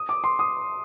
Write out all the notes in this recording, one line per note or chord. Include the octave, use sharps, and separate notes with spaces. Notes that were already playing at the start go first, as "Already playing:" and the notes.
Already playing: D#6
D6
C6
D#6